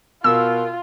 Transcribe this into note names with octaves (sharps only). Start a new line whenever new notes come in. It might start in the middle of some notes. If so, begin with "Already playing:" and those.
B2 F4 A#4 E6